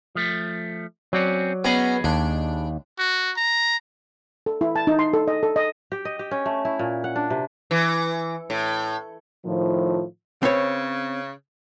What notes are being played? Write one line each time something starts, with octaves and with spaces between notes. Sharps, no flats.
F3 A3
F#3 C4 C#4 D5
B3 C#4 G#4 D#5 A#5 B5
D#2 D4
F#4
A#5
A4
E4
A5
D#4
C6
A4
D#5
A4
D#5
G4
D#5
G4
C#4
A3
E4
A#2
F#5
D4
C3
E3
A2
A2 D#3 F3
C#3 C4 B4 C#5